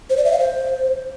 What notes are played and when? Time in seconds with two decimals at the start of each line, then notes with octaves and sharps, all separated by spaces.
0.10 C5
0.17 D5
0.25 E5
0.32 F5
0.39 C5